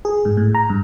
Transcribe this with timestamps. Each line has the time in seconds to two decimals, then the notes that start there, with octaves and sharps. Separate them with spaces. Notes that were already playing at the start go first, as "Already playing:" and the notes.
0.05 G#4
0.25 G#2
0.37 A2
0.55 A#5
0.70 G2